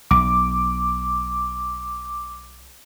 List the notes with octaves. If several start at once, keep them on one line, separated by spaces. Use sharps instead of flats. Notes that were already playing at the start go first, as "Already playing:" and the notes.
B1 D6